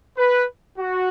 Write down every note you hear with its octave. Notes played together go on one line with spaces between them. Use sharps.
B4
F#4